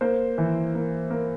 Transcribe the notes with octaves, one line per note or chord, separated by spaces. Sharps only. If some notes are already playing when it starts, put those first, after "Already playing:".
A#3 C5
E3
A#3
A#3